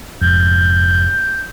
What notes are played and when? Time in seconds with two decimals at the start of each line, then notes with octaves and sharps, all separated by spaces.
0.21 F1 F2 G#2 G6